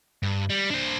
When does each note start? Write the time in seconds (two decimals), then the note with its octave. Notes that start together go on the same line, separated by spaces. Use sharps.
0.23 G2
0.49 G3
0.70 D4 C5